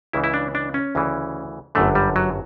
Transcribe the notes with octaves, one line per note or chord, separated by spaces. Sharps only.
C#2 C#3 E3 E4
E4
D4
D4
C#4
D2 C#3 E3
G1 F#2 D3 A3
G3
F#3